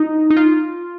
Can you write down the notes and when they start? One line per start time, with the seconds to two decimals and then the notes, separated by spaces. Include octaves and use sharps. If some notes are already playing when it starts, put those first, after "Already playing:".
Already playing: D#4
0.30 D#4
0.37 F4